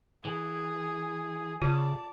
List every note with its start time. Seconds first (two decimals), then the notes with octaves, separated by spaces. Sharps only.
0.25 E3 G#4
1.62 C#3 F4 D5 A5